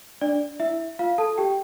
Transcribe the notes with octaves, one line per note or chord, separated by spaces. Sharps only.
D4 D5
E4 E5
F4 F5
A4 A5
G4 G5